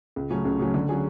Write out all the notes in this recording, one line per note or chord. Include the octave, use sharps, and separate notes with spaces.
C#2
C#3 F#3 A3 C#4
C#2
C#3 F#3 A3 C#4
D3
F#3 C#4 G#4